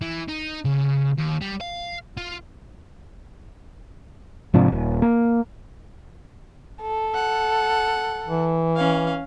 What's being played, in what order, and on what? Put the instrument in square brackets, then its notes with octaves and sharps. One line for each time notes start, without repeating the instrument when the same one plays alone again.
[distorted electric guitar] E3
D#4
C#3
D#2
G3
F5
F4
[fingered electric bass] G#2 C3 F3 D4
D#1
A#3
[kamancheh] A4
[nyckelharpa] F#5
[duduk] E3
[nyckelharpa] C#4 F5